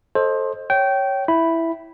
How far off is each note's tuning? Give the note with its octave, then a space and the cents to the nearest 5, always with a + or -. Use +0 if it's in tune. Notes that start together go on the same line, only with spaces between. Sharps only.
A4 +0 C5 +20 D#5 +0
C#5 +0 G5 -20
E4 +0 B5 +0